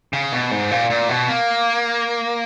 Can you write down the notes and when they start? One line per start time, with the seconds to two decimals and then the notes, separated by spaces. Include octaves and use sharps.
0.13 C#3
0.33 B2
0.51 G#2
0.71 A#2
0.90 A#2
1.09 B2
1.29 A#3